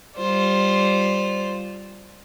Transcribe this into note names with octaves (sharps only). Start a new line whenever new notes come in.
G3 F4 C5 D5